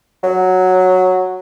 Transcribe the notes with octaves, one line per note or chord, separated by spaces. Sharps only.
F#3